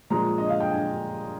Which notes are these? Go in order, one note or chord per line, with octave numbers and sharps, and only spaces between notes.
A#2 F3 G#3 A#5
D#5
F5
G5
G#5